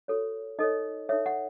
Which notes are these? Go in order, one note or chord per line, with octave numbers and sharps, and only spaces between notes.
F#4 A4 C#5
D#4 A4 C#5 D#5
D#4 A4 C#5 E5
F#5